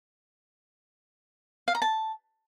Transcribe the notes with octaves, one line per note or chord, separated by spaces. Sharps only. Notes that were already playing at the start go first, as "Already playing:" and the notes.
F5
A#5
A5